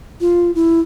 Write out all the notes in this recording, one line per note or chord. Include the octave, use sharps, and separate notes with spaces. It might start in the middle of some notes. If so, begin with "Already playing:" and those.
F4
E4